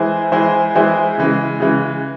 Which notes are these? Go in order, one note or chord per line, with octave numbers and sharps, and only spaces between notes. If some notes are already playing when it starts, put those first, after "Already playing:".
Already playing: E3 G#3 E4 G#4 C5
E3 G#3 E4 G#4 C5
E3 G#3 E4 G#4 C5
C#3 E3 G#3
C#3 E3 G#3